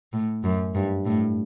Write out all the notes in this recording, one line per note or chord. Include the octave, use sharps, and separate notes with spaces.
A2
F#2
G2
A2